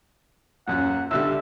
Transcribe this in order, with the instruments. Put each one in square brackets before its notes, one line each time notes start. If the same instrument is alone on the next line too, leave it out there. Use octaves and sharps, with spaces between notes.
[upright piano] D#1 F#2 C#4 [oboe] F#5
[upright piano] B1 D3 G3 [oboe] E5